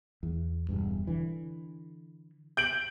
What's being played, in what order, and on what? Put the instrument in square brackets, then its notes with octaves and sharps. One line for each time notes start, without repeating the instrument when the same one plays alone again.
[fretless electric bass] E2
E1 G2
D3 E3
[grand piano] G6 D7 F#7